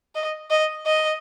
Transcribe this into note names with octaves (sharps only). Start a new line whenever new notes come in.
D#5
D#5
D#5